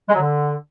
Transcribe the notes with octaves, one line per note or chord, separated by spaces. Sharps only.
G#3
F#3
D3